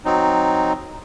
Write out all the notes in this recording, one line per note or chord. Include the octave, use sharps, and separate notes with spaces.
F#3 C4 D#4